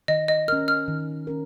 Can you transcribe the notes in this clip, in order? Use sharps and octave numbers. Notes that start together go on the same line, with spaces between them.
D#3 D#5
D#5
C#4 A#4 F6
F6
D#3
C#4 A#4